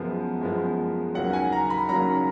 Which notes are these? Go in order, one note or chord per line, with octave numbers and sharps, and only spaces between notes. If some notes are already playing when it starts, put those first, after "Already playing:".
Already playing: F#2 F3 G#3 B3
F#2 F3 G#3 B3
D#2 C#3 F#3 C#4 F#5
G#5
A#5
B5
D#2 C#3 F#3 C#4 A#5